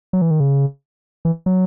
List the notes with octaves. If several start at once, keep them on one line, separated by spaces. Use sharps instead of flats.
F#3
E3
D#3
C#3
E3
F#3